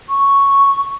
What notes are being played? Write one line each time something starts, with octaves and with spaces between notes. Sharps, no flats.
C#6